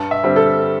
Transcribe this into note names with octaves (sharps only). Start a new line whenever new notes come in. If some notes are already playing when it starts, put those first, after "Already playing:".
Already playing: G2 A5
E5
D3 G3 C4
A4